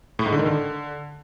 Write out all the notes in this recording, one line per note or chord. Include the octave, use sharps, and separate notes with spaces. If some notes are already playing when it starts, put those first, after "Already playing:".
A2
G#2
D3
D#3
D3